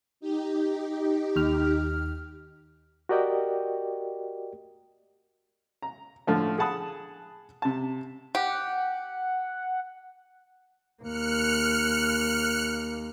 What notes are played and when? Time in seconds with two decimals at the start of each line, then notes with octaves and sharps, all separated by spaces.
0.20 D#4 G4
1.36 D#2 F6
3.09 F#4 G4 A#4 D5 D#5 G5
5.82 A#5
6.27 A2 D3 F3 A3
6.58 G#4 F#5 A5 B5 D#6
7.62 C3 A5
8.35 G4 F#5
11.03 D#2 A#3 F6 F#6 C#7